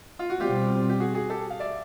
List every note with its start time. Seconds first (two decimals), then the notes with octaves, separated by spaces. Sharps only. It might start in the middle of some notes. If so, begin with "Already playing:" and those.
0.19 F4
0.30 F#4
0.40 B2 G3 C4 F4 G4
0.89 G4
1.00 F#4 G#4
1.14 F#4 G#4
1.30 G4 A4
1.50 F5
1.60 D5 E5